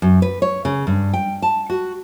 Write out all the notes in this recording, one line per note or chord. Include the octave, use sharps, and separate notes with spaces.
F#2
B4
C#5
C#3
G2
G5
A5
F#4